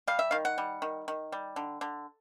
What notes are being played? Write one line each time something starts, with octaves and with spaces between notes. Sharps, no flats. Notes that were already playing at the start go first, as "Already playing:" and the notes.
G3 F5
E5
D#3 F5
F#5
G3
D#3
D#3
G3
D3
D3